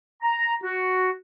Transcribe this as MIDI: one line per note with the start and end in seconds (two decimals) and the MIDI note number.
0.22 0.54 82
0.62 1.11 66